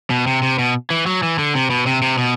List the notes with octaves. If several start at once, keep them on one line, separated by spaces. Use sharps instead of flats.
B2
C3
C3
B2
E3
F#3
E3
D3
C3
B2
C3
C3
B2